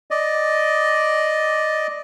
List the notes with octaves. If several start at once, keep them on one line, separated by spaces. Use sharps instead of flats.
D5 D#5